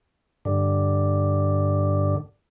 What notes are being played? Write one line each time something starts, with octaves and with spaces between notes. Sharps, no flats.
G2 D3